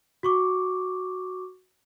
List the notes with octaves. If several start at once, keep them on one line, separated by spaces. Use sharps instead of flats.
F#4 C#6 D6